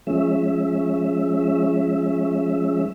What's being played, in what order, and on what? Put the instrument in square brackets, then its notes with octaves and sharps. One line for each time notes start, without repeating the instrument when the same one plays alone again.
[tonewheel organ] F3 G#3 C#4 E5